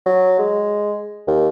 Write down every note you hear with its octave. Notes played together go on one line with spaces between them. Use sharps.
F#3
G#3
D#2